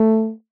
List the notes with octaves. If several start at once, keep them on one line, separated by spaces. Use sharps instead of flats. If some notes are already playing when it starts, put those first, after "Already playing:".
Already playing: A3